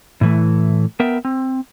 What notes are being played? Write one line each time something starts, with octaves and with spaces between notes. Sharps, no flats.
A2 E3 A3
B3 A#4 E5 G5
C4